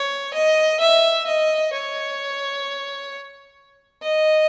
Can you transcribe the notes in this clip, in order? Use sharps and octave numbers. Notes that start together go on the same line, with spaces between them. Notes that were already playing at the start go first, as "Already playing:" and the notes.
Already playing: C#5
D#5
E5
D#5
C#5
D#5